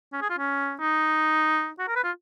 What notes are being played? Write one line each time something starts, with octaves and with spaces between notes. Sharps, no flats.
C#4
G#4
F4
C#4
D#4
F#4
A#4
B4
F4